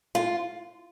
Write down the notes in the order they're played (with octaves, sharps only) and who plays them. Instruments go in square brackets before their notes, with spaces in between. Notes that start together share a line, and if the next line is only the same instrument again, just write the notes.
[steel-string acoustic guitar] F4